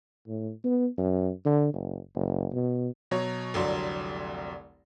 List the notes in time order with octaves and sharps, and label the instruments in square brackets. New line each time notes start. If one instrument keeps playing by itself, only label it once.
[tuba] A2
B3
F#2
D3
F#1
F#1
B2
[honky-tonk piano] B2 F#3 C#5
F1 C2 D3 F#3 D5 C6